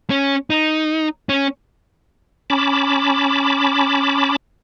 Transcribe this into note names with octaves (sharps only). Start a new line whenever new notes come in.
C#4
D#4
C#4
C#4 A5 B5 D6